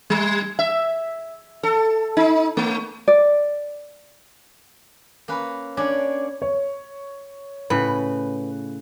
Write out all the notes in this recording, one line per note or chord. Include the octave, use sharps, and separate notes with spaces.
G3
E5
A4
D#4
A3
D5
A#3 C#4 B4
C#4 D4 C#5 D5
C#5
A2 C#3 B4